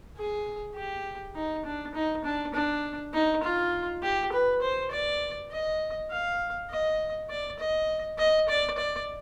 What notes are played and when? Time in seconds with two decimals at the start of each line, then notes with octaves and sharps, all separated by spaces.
0.17 G#4
0.76 G4
1.35 D#4
1.65 D4
1.95 D#4
2.24 D4
2.54 D4
3.13 D#4
3.43 F4
4.02 G4
4.32 B4
4.62 C5
4.91 D5
5.51 D#5
6.10 F5
6.70 D#5
7.29 D5
7.59 D#5
8.18 D#5
8.48 D5
8.78 D5